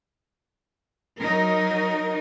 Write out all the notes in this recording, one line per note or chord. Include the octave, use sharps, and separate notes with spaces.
F#3 D#4 A#4